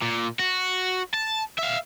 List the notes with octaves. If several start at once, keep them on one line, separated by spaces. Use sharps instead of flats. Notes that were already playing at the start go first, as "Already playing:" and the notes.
A#2
F#4
A5
E5 F5